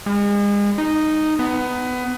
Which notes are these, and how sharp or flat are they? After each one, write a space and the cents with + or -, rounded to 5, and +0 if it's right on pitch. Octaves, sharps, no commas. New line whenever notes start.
G#3 -35
D#4 -5
B3 +20